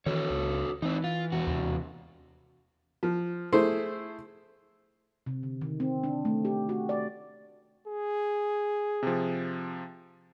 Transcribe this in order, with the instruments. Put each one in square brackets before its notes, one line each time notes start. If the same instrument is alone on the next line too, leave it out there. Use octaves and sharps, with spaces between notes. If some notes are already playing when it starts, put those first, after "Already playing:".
[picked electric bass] D#3 E3 [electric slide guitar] F#4 A4 C#5
[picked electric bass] C#2
[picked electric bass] E3 [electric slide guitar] C4 D#4
[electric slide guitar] F4
E2 F#4
[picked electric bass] D#2 C3
[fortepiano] F3
A3 E4 G#4 C5
[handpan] C3
D3
D#3
C4
D4
A3
G4
F#4
D5
[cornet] G#4
[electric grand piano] C3 F3